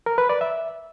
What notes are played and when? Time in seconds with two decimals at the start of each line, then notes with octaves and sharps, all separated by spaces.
0.06 A#4
0.18 B4
0.29 D5
0.41 E5